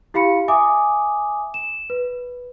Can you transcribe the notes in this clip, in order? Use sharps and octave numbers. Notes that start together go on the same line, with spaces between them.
E4 G4 F5 B5 C#7
E5 G#5 D6 D#6
E7
B4